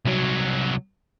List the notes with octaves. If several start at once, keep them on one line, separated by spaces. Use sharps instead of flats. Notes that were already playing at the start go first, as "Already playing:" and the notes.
C2 F#3